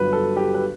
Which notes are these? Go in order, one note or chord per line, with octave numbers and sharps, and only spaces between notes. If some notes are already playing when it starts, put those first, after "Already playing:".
Already playing: G1 G2 F#3 B4
A4
G4
B4